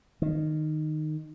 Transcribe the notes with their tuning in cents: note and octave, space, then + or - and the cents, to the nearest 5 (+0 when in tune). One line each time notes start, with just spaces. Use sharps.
D#3 -15